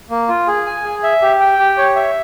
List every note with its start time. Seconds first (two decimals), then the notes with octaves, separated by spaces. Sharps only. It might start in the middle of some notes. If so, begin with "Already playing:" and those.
0.10 A#3
0.28 F4
0.47 G#4
0.66 G#5
0.84 G#4
1.03 E5
1.22 G4
1.40 G5
1.59 G4
1.78 C#5
1.96 E5